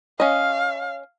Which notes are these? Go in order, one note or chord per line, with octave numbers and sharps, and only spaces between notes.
C#4 D#5 F5